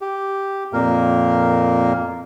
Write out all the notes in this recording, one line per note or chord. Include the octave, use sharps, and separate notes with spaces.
G4
F2 A#2 A#3 A#4